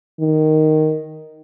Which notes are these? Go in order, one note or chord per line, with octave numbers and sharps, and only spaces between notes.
D#3